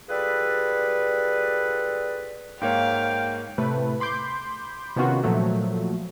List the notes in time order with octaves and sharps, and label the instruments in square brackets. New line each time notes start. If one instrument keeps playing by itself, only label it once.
[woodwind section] G3 F4 G#4 A4 B4 D5
[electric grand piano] G#2 A#3 C#5 [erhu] F5 [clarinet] G5
[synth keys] A2 C3 A3 B4
B5 C6 D6 G6
C3 D#3 B3 C#4 F4 F#4
A#2 F3 F#3 A3